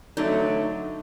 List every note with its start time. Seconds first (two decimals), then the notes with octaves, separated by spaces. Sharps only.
0.17 D3 F#3 A3 D#4